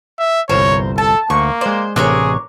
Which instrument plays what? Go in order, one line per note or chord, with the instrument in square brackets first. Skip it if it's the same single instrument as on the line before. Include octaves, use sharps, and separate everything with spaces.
[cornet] E5
[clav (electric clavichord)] G1 C2 [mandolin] A#4 C5 [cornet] C#5
[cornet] A4 [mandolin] A5
[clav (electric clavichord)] D2 [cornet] A#3 [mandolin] C#6
[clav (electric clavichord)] G#3 D5 [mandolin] C5
[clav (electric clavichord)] A1 C3 E5 [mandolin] D4 A#4 C#5 [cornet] G#4